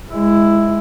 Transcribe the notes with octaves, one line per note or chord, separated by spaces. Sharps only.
G#3 E4